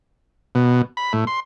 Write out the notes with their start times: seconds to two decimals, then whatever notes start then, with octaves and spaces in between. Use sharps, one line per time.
0.55 B2
0.97 B5
1.13 A2
1.27 C6